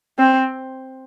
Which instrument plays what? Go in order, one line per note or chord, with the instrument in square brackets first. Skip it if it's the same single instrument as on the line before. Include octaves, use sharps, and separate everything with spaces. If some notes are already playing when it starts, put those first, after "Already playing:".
[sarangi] C4